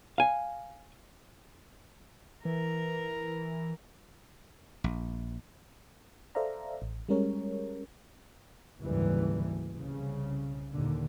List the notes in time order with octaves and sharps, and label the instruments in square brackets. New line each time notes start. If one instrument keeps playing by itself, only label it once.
[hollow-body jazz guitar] F5 G#5
[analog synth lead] E3 [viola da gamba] A#4
[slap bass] A#1
[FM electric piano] A4 C5 D5 E5 F5 A#5
A1
G3 G#3 C#4 A#4 C#5
[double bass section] F#1 D2 G#2 E3 G3
C2 C#3
D#2 A#2 D3